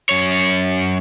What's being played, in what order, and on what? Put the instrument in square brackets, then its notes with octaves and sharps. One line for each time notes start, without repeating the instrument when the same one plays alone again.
[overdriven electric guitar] F#2 C#5